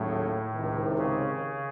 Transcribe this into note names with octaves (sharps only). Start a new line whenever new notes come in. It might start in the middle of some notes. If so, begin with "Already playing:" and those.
Already playing: D#2 A2 C#3 F#3 A3
C#2 C3 D#3
C#3